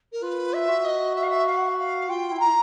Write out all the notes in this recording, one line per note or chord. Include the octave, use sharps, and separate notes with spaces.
A#4
F4 B4
E5
F#4
D#5
E5
F5
E5
F5
F#5
F5
F5
F4 G5
E4
F4 A#5
E4